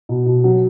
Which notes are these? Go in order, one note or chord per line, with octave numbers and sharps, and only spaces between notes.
B2
B2
F#3